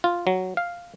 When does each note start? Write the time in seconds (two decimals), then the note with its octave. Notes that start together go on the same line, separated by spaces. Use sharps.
0.04 F4
0.27 F#3
0.57 F5